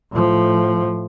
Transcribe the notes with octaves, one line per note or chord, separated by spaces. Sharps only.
A2 F3